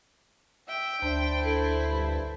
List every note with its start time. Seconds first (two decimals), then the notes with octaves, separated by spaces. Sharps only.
0.68 E5 G5
1.02 D2 D4 C5 A5 B5
1.43 E4 A4
1.89 G2